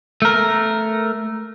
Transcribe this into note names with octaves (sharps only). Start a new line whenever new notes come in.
A3 A#4